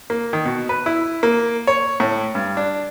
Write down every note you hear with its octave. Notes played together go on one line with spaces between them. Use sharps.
A#3
D#3
B2
B4
E4
A#3
C#5
A2
G2
D4